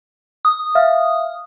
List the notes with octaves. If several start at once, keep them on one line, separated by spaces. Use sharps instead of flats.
D#6
E5 F5 F6